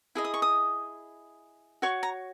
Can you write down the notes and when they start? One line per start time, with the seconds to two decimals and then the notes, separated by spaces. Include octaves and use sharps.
0.15 E4 G#4 D#5
0.25 D#6
0.34 C#6
0.42 D#6
1.82 F#4 C#5 C#6
2.03 A#5